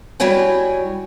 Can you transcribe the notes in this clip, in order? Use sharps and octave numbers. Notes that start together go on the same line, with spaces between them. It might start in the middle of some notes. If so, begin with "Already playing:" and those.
G3 E4 F#4 C#5 G5 G#5